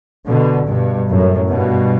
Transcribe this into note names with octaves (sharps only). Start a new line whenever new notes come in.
B2 D3
G2 B2
F#2 A2
G2 B2